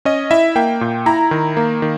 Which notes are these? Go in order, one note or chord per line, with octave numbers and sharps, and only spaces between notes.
C#4 D#5
E4 E5
A#3 G5
A#2
E4 A#5
D#3
A#3
D#3